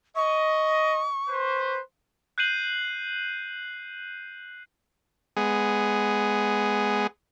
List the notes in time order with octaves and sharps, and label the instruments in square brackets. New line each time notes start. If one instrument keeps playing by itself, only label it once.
[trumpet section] D#5 [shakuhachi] C#6
[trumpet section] B4 C5
[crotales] F#6 G6 C7 D#7 F#7
[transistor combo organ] G#3 B3 G#4